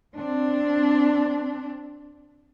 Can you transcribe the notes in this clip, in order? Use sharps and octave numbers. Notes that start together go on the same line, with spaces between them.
C4 D4